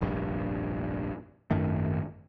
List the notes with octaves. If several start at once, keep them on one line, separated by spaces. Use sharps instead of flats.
F1 A#1 G2
G#1 F#2 D#3 A3